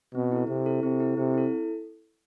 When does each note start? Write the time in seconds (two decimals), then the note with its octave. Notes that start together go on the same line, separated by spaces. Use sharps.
0.15 B2 C4
0.32 E4 A4
0.48 C3 C4
0.66 E4 A4
0.83 C3 C4
1.00 E4 A4
1.17 C3 C4
1.34 E4 A4